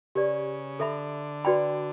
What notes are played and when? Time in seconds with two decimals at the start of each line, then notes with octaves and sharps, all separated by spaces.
0.15 C#3 G4 B4 D5
0.79 D3 A4 E5 B5
1.45 F#4 B4 D5 G5 B5